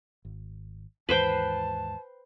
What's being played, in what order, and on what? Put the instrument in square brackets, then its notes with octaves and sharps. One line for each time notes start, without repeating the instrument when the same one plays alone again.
[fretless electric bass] G#1
[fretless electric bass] D#2 G#2 E3 [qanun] B4 C5 G5 [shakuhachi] A5